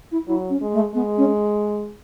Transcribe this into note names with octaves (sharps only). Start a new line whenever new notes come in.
E4
F#3 E4
C#4
G#3
A3
G#3 B3
C#4